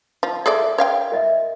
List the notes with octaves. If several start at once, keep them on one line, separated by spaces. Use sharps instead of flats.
F3 A5
G#4 A4 D5 E5
A#4
C#5 F5 G5
A#4 D#5 E5